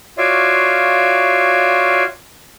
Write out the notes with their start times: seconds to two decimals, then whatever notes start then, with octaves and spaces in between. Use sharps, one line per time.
0.18 F4 F#4 C#5 D5 E5 F5